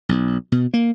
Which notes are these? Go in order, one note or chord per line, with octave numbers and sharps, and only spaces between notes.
B1
B2
A#3